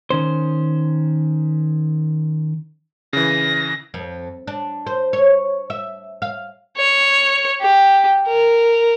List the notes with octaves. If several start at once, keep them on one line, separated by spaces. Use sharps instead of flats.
D#3 C#4 C5
C#3 E3 A#6
F2
D4
C5
C#5
E5
F5
C#5
G4
A#4